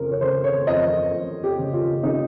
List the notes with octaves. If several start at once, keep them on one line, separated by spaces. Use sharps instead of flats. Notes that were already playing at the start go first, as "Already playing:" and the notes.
Already playing: F2 C#3 A#4
C#5
C#3 C5
C#5
F2 D#5
F2
G4
C#3
F4
C#3 D#4